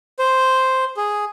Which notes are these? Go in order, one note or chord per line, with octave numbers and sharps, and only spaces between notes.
C5
G#4